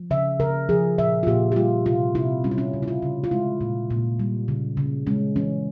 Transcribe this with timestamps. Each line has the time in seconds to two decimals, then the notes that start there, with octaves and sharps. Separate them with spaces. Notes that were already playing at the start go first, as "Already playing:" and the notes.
Already playing: F3
0.11 C#3 E5
0.40 C#3 A#4
0.69 F3 G#4
0.98 A#2 E5
1.23 F4
1.27 A#2 G4
1.52 G4
1.56 G3 F4
1.86 C3 F4
2.15 C3 E4
2.44 G3 C#4
2.51 E4
2.58 C#4
2.74 C#3
2.82 E4
2.88 F4
3.02 C#3
3.24 F4
3.31 G#3 E4
3.61 A#2
3.90 A#2
4.19 G3
4.48 C#3
4.77 C#3
5.07 G#3 C#4
5.36 E3 C#4